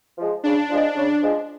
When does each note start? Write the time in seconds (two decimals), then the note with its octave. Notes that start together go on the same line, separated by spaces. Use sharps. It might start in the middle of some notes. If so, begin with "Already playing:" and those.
0.18 F3 G#3
0.43 C#3 D4
0.70 F3 G#3
0.95 C#3
1.22 F3 G#3